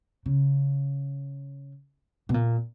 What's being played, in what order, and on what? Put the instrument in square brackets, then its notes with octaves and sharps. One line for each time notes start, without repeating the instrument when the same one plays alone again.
[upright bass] C#3
B2
A#2